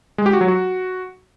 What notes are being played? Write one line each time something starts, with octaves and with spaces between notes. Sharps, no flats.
G#3
G4
F#4
F#3
F#4